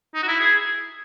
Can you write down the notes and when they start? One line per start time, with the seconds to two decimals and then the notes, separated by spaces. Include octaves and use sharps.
0.15 D#4
0.23 F#4
0.28 E4
0.40 G#4